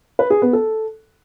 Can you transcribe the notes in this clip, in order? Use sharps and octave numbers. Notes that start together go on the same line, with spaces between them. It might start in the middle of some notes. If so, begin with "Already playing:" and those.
B4
G#4
B3
A4